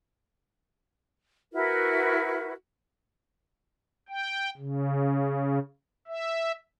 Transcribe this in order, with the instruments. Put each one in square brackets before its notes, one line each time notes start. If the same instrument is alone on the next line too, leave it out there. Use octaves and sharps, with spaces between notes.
[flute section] E4 F#4 A#4 B4
[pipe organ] G5
C#3
E5